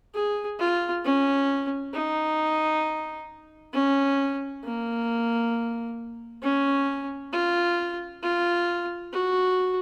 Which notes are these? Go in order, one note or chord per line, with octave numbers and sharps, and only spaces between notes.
G#4
F4
C#4
D#4
C#4
A#3
C#4
F4
F4
F#4